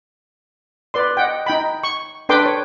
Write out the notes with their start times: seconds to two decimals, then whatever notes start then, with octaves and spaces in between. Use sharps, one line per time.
0.94 B4 D5 C6
1.17 D#5 F#5 G5
1.46 D#4 G5 B5
1.84 C#6
2.29 D4 A4 B4 G5 C6 D6
2.46 C#5